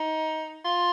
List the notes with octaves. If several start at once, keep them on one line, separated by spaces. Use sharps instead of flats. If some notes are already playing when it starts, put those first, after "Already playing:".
Already playing: D#4
F4